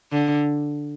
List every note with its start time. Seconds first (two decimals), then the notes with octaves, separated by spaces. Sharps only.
0.12 D3